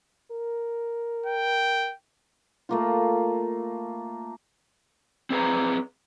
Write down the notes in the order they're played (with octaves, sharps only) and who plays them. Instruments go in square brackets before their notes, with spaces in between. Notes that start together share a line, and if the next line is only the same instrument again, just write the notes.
[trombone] A#4
[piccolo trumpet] G5
[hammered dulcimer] A3 A#3 F4
[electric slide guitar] C4 G#4 B4 A#5